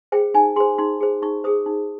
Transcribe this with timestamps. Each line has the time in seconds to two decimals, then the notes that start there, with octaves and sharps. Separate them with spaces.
0.12 G#4 C5 G5
0.34 D#4 G#5
0.56 G#4 C5 C6
0.78 D#4 C6
1.01 G#4 C5
1.22 D#4 C#6
1.44 G#4 C5 D#6
1.66 D#4